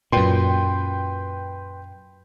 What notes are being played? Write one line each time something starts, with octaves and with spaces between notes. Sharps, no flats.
F#2 A#2 B4 G5 C6